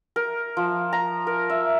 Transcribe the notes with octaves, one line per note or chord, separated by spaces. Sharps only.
A#4
F3
A#5
A#4
E5